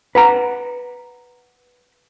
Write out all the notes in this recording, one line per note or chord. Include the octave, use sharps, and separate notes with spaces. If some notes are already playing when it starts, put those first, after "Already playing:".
B4 F#5 A#5